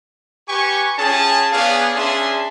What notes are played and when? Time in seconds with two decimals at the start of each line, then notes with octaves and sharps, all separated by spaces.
0.49 G4 B4 G#5 C#6
0.99 C#4 F4 G#4 G5 A5
1.53 B3 D4 G#4 C#5 F5
1.95 C#4 D4 G#4 E5 A5 C6